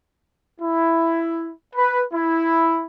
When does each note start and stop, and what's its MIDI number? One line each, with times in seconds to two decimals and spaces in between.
0.61 1.50 64
1.76 2.04 71
2.14 2.85 64